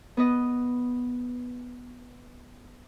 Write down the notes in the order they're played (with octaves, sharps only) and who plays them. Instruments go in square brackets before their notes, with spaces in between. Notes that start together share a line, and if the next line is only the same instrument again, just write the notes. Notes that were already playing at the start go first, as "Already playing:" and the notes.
[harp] B3 B4 D#5